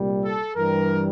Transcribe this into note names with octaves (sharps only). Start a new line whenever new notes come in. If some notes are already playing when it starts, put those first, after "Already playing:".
Already playing: C2 A#2 G3
A4
G2 E3 G3 A#4